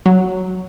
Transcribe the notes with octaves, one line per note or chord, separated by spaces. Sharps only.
F#3